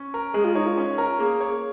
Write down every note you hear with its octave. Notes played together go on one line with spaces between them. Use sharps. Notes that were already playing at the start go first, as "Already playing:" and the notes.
Already playing: C#4
A#4
G#3 G#4
F4
D#4 C#5
F4
C#4
A#4
A#3 G#4
C#5